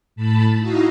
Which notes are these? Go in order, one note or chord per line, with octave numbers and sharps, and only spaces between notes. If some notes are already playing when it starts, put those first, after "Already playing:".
A2 A5 B5
D#4 E4 F#4 D#5 F5